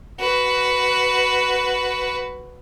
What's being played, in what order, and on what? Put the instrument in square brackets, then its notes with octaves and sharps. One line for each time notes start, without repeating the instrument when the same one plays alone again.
[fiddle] F#4 B4